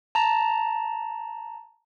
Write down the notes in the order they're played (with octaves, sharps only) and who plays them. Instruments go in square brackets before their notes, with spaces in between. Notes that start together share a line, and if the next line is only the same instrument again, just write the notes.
[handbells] A5 A#5